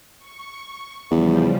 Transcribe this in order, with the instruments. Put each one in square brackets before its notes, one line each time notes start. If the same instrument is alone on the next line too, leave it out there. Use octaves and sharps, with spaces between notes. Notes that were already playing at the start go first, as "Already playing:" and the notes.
[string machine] C#6
[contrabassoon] E2 [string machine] C#3 F3 G3